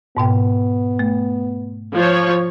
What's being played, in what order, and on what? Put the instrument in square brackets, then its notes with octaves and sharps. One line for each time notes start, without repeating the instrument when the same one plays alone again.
[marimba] G#2 B2 G5 [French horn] B3
[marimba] A3
[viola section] F3 C#5